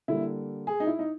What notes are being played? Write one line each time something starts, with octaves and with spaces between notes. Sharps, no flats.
D3 G3 A#3 E4
G#4
D#4
E4
D#4